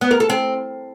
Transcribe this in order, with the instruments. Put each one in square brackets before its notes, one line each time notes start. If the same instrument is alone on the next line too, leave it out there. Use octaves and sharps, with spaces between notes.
[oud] B3
A#4
A4
C4